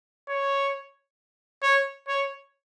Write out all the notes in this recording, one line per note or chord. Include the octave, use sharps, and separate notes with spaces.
C#5
C#5
C#5